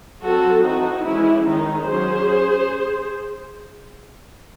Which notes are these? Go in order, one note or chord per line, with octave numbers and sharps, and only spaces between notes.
F#3 C4 F#4 A4
E3 C4 D#4 F#4
E3 G#3 C#4 E4
D#3 G#3 C#4 D#4
F#3 C#4 G#4 C5